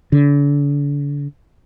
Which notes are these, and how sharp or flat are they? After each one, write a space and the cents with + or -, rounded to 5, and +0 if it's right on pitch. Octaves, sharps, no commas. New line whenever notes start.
D3 -40